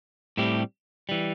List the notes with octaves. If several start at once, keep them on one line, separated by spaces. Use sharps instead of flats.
A2 G3 C4 E4 G4
E3 G3